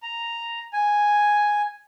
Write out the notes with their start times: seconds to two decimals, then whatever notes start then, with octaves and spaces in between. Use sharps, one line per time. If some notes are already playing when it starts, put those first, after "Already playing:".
0.03 A#5
0.73 G#5